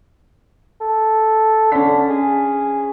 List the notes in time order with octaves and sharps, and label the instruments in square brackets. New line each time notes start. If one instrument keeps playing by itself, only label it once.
[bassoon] A4
[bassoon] D3 [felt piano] C#4 B6
[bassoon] G#4